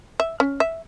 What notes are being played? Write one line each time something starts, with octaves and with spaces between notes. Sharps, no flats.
E5
C#4
E5